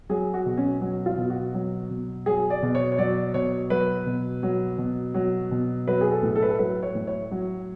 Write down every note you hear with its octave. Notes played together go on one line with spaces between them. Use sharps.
F#3 G#4
F#4
B2
C#4
F#3
F4
B2
F#4
F#3
B2
F#3 G#4
D5
B2
C#5
C#5
F#3 D5
B2 C#5
F#3 B4
B2
F#3
B2
F#3
B2
F#3 B4
G#4
A4
A2
A4
B4
A4
F#3 B4
C#5
A2
C#5
F#3